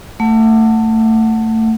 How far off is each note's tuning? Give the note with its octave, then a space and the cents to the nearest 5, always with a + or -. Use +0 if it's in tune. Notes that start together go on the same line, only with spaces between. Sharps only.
A3 +20 F#5 +0